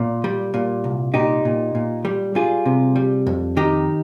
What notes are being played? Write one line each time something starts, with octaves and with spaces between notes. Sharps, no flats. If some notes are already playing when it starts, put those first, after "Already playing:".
Already playing: A#2
G3
A#2
C2
A#2 D#4 G4
A#2
A#2
G3
G3 F4 G#4
C3
G3
F2
D#3 D#4 G4